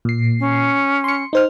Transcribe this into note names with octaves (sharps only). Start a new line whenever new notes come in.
A#2 C7
C#4
C6 C#7
D#4 C5 F6